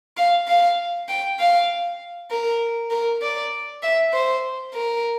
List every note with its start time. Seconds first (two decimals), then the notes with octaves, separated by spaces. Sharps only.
0.17 F5
0.48 F5
1.08 G5
1.40 F5
2.31 A#4
2.91 A#4
3.22 D5
3.83 E5
4.13 C5
4.74 A#4